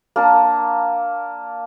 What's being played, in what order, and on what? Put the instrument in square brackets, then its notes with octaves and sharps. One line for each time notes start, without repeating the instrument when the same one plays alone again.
[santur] A#3 D4 A5